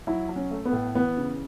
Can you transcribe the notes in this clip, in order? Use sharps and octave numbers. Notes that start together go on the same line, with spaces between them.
F#3 E4
F#3
C#4
A3
B3
A2
E3 B3
C#3